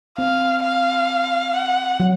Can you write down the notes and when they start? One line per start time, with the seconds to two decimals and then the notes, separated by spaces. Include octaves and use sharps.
0.18 C4 F5
0.63 F5
1.54 F#5
2.00 F#3